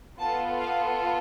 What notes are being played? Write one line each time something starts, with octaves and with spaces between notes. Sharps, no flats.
B3 F4 A4 A5
F5